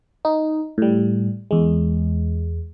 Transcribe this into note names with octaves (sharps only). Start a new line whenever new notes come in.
D#4
A2 G3
E2 G#3